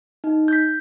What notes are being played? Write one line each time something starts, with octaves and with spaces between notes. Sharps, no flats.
D#4
G6 B6